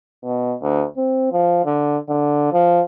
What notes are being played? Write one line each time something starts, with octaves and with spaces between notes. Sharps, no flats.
B2
D2
C4
F3
D3
D3
F3